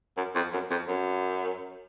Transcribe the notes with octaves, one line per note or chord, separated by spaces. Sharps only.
F#2
F2
F#2
F2
F#2